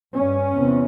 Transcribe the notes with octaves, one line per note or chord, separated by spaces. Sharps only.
G2 C#4
E2 C3